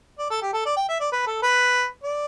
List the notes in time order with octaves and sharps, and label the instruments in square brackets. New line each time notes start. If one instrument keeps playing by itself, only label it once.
[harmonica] D5
A4
G4
A4
D5
G5
E5
D5
B4
A4
B4
D5